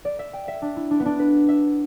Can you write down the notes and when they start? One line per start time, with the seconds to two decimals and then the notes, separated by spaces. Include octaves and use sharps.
0.05 D5
0.19 E5
0.33 G5
0.48 E5
0.62 D4
0.77 E4
0.91 D4
1.00 B3
1.06 D4
1.19 B4
1.49 E5